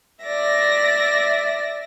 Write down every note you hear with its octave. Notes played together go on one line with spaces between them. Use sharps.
D5 E5 A#6